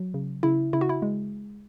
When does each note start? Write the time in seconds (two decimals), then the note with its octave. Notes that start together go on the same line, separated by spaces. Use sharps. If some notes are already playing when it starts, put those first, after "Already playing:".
Already playing: F#3
0.14 C#3
0.43 C#3 E4
0.73 C#3 E4
0.81 F#4
0.89 E4
1.02 G#3